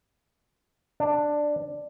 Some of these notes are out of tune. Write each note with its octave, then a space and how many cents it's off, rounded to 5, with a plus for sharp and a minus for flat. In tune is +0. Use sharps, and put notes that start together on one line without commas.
D4 +10